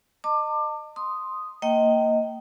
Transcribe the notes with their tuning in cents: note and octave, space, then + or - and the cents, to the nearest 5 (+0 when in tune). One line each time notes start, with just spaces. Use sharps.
D#5 -25 A5 +40 D6 +20
C6 +0 D#6 +0
A#3 -20 D#5 +15 G5 -20